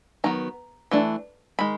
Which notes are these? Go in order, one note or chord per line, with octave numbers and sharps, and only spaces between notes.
D#3 F#3 B3 A#5
E3 A3 D4
D#3 G#3 B5